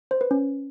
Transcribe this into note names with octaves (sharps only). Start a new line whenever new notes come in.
C5
B4
C#4